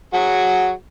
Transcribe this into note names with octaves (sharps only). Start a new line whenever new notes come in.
F#3 F#4 G#4